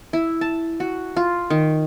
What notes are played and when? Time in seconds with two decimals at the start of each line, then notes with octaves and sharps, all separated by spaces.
0.13 E4
0.41 A5
0.80 F#4
1.17 F4
1.50 D#3